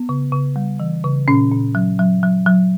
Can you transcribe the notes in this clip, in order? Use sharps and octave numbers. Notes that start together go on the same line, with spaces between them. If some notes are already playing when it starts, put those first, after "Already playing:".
Already playing: B3
C#3
C#3
G3
E3
C#3
A#2 C#4
A#2
F#3
F#3
F#3
F#3